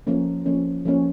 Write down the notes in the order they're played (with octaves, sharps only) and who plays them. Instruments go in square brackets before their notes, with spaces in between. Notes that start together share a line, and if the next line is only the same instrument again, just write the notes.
[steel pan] F3 A#3 C#4
F3 A#3 C#4
F3 A#3 C#4